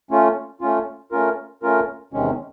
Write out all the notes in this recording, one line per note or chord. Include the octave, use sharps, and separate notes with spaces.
A3 C#4 F4
A3 C#4 F4
A3 C#4 F4 A#4
A3 C#4 F4 A#4
E2 C3 D#3 G#3 C#4